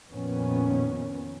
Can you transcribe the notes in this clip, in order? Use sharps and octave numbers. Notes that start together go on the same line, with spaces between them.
F2 A#2 D#3 B3 C#4